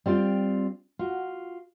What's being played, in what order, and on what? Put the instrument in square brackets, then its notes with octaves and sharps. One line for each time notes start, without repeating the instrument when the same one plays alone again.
[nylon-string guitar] G3 C4 F4 G5
F4 F#4